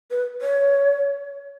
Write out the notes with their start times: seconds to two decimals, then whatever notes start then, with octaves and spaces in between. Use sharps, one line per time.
0.11 B4
0.41 C#5